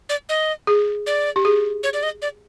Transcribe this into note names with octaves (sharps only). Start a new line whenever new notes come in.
D5
D#5
G#4
D5
G4
G#4
C#5
D5
D#5
D5